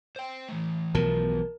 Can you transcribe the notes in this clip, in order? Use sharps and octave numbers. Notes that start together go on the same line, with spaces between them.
C5 G5
E3 A3
B1 B2 F3 A#4 A5